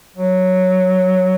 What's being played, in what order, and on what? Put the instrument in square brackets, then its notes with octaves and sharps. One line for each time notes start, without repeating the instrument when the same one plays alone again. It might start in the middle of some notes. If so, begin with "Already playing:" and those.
[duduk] F#3